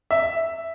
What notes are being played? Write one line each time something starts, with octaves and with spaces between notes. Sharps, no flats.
E5